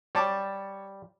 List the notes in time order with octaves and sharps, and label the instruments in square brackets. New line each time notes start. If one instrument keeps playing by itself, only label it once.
[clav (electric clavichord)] G3 [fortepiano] C#5 A5 D6